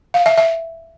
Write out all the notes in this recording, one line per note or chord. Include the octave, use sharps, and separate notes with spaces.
F5
E5
E5